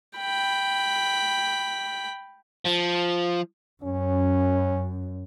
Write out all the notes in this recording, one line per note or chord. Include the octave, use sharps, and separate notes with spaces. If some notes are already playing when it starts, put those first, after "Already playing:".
G5 B5
F3
F#2 C#4